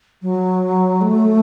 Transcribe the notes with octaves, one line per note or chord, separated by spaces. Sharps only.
F#3
A3